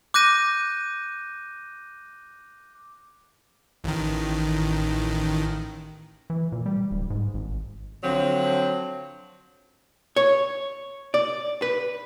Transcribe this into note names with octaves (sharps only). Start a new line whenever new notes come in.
D6 F#6 G6 A#6 D#7
A1 D#3
E3
A#2
G3
D1
G#2
G#1
D3 F3 F#3 C4
C#5
D5
B4